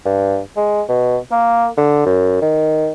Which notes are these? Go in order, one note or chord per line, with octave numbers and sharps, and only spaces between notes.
G2
G#3
B2
A#3
D3
F#2
D#3